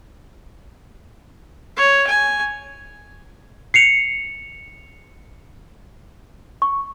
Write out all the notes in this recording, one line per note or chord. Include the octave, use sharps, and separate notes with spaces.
C#5
G#5
C7 C#7 F7
C#6